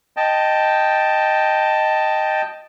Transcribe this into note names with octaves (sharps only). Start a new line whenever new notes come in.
D#5 G5 A5